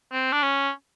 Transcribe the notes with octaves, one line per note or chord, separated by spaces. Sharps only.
C4
D4
C#4